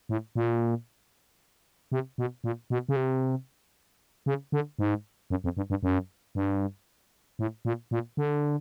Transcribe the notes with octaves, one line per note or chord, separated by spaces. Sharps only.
A2
A#2
C3
B2
A#2
B2
C#3
C3
C#3
D3
G#2
F#2
F2
G2
G2
F#2
G2
A2
A#2
A#2
D3